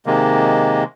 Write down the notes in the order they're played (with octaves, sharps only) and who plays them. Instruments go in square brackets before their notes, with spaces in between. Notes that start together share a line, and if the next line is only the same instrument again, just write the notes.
[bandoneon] C3 D#3 G#3 A#3